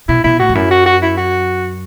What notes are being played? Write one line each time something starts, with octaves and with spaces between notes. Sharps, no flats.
B2 E4
B2 E4
A2 F#4
E2
F#2 E4
F#4
F#4
E4
F#4